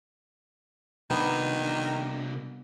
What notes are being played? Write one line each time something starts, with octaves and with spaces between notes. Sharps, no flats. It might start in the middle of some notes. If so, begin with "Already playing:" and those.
C2 D#3 B3 D4